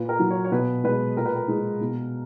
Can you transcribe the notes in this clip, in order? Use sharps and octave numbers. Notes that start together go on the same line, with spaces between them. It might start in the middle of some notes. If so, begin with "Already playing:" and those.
Already playing: A#2 B4
A#4
F#3
C#5
C#5
B2 B4
G#3 B4
A#2 A#4
B4
A#4
G#3
B2